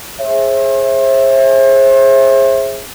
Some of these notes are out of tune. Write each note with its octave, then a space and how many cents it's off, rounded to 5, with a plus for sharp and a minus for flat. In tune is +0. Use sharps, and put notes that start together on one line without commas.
G#4 +0 C5 +40 E5 +0